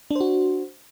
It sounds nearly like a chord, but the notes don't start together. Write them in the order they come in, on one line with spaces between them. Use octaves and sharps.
D4 C5 F#4